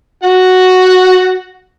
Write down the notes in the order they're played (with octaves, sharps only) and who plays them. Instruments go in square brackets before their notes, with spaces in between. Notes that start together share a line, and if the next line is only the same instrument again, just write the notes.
[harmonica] F#4 F#5